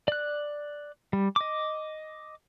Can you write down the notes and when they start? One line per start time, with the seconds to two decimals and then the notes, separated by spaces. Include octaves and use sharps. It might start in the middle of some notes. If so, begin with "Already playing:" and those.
0.08 D5 F#6
1.13 G3
1.36 D#5 D6